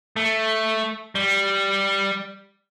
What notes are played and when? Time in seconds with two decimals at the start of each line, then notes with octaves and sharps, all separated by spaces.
0.16 A3
1.15 G3